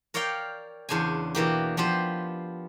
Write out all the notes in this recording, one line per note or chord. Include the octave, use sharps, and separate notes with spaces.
A#4 C#5 D5 F5 G5
E2 C#3 D4 C5 G#5
B2 E3 A#3 G4
F3 B3 G4 C5